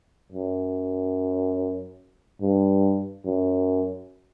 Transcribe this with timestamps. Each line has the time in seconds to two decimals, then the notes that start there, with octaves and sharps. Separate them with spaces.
0.32 F#2
2.41 G2
3.25 F#2